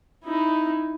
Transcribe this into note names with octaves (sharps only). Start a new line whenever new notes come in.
D#4 E4